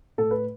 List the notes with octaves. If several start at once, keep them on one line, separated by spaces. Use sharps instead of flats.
A2 A4
B4